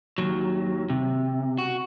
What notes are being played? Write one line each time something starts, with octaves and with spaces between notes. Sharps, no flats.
D#2 F#3
C3
F#4